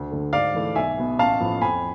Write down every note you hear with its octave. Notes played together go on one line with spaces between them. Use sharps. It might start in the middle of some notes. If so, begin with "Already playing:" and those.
Already playing: D2
D3 A3
G#2 D5 F5
E3 A3
B1 E5 G#5
B2 B3
A1 F5 A5
A2 F3 B3
F2 G#5 B5